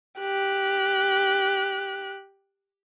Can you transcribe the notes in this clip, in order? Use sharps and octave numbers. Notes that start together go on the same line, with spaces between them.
G4 F#6